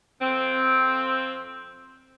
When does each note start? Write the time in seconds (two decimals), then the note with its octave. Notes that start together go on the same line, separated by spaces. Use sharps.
0.21 F2 C4